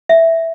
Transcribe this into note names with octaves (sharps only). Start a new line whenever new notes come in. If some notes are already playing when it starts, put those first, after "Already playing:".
E5